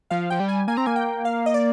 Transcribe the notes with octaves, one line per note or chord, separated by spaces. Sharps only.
F3 F5
F3 G5
G3
G#5
A#3 G#5
C4 A#5
A#3 G#5
G5
F5
D#5
D5